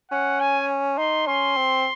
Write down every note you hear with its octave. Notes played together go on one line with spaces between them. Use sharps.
C#4 F#5
G#5
D#4 C6
C#4 C6
C4